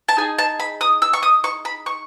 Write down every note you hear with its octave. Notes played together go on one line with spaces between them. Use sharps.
A5
D#4 G#4 G#5
A5
B5
D#6
E6
C#6
D#6
C#6
B5
C#6